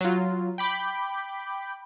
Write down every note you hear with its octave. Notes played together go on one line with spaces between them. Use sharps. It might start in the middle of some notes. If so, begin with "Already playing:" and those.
F#3 F4
G5 B5 D6 G6